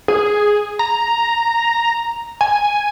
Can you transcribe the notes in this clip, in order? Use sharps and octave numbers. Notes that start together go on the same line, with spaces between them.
G#4
A#5
G#5